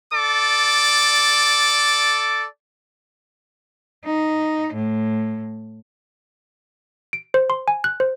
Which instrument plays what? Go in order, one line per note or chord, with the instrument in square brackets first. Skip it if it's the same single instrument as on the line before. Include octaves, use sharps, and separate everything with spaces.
[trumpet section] A4 D5 D6
[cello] D#4
A2
[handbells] D7
C5
C6
G#5
F#6
C5